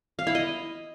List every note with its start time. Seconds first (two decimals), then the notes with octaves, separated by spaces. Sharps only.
0.19 F5
0.27 E4
0.35 D#5